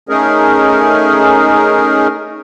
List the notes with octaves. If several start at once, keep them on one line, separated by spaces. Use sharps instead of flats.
A3 C#4 D#4 G#4 A#4